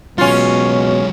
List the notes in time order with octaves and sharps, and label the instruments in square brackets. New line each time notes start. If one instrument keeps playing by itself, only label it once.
[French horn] B2 [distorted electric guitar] F#3 G#3 [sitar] C#4 F4